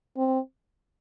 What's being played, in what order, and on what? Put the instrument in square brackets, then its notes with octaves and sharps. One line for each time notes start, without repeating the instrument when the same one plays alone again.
[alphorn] C4